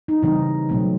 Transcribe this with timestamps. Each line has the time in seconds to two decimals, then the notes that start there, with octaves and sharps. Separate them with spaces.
0.08 D#4
0.23 C#3 E3 G3 C4 D#4
0.69 B2 F#3 A3 C4